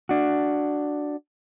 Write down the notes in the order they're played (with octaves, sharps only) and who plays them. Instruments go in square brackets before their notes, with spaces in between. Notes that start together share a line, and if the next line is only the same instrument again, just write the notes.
[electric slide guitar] D4 F#4